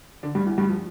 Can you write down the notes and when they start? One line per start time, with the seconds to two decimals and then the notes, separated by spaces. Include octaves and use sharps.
0.23 D3 D4
0.35 G2 G3
0.46 E2 E3
0.58 G2 G3
0.69 F3